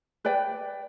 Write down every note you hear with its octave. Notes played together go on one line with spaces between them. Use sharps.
B4 D5 G5